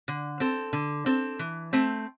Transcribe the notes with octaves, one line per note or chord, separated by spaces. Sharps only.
D3
C4 A4
D3
C4 A4
E3
A3 C4